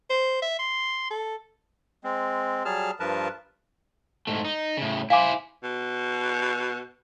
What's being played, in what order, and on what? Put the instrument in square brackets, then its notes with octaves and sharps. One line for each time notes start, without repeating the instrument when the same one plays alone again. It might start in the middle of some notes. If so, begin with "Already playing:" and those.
[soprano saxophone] C5
E5
C6
A4
[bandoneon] G#3 C4
F#3 G3 G#4 A5 F6
G2 F3 A#4 B4 A5
[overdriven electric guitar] G#2 A3
D#4
A2 C#3
[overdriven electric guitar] E4 C5 [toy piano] F5 G#5 D6
[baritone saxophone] B2